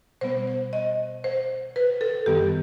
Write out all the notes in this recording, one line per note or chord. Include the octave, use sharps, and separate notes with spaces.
B2 G3 B3 C5
C5
D#5
C5
B4
A4
F#2 D#3 G3 B3 G4